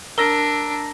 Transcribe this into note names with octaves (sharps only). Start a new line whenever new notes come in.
D4 A#4 A#5 E6 A#6